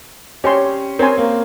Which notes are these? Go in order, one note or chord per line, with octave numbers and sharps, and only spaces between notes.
C#4 G4 C#5 G#5 C6
C4 A#4 C#5 G#5 C6
A#3